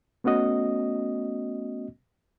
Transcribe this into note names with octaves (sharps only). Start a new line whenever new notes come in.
A3 B3 C#4 F#4 D#5